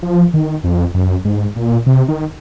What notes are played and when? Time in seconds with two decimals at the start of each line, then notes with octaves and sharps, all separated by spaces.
0.02 F3
0.34 D#3
0.64 F2
0.94 F#2
1.25 G#2
1.56 A#2
1.86 C3
2.08 D#3